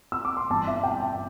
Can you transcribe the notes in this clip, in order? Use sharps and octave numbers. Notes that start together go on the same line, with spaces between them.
E6
D6
C6
G1 G2 E3 A5
E5
G5
A5